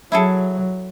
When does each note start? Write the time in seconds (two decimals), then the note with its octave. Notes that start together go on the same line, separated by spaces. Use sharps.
0.12 F#3 E4 G#4 A4